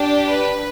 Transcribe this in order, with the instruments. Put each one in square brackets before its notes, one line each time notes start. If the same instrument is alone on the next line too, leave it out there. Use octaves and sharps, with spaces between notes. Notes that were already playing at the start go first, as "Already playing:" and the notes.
Already playing: [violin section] D4 G4
B4